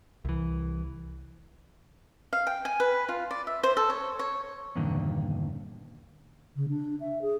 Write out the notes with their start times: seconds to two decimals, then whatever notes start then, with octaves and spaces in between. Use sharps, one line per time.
0.25 C2 E3
2.33 F5
2.47 G5
2.65 G#5
2.80 B4
3.09 F4
3.31 D5
3.47 E5
3.63 C5
3.77 A4
3.90 C#5
4.19 C#5
4.76 E2 G2 A#2 D3 D#3
6.56 C#3
6.69 D4
7.00 E5
7.21 G#4